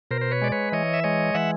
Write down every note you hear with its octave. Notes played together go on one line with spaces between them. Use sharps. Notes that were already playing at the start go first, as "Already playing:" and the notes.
B2 A#4 C5
C5
B4 C#5
G#3 D5
B4 C#5
E3 C#5 D#5
E5
G#3 C#5 D#5
E3 E5 F#5